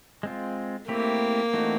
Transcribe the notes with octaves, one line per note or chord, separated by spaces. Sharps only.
G#3 C4 F4
A3 A#3 C4 E4 G4
E3 A3 C4 D#4 F#4